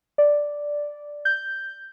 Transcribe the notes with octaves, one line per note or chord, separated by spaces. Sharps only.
D5
G6